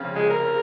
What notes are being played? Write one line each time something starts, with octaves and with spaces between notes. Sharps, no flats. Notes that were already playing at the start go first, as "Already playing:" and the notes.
Already playing: F1 F2 C#3
G#3
A#4